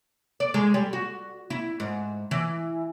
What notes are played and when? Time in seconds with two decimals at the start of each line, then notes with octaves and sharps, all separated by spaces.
0.40 D5
0.54 G#3
0.74 G3
0.93 F#4
1.50 E4
1.80 G#2
2.31 E3